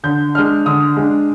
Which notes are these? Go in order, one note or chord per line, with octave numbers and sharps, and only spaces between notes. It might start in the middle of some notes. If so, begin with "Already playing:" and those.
D3 G6
G#3 D4 F6
D3 D#6
G#3 D4